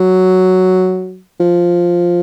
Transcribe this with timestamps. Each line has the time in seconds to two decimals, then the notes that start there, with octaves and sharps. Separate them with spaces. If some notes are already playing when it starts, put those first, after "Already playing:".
Already playing: F#3
1.40 F3